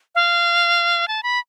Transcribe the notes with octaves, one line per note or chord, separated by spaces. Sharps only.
F5
A5
B5